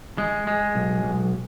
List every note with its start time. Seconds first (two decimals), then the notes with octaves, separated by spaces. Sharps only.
0.18 G#3
0.47 G#3
0.75 B1
1.03 B1